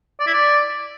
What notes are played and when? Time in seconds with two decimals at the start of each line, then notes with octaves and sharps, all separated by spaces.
0.20 D5
0.27 E4
0.34 D5